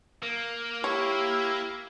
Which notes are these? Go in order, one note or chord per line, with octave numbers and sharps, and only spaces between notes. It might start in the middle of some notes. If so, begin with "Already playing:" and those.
A#3 A#4
E4 G4 C#5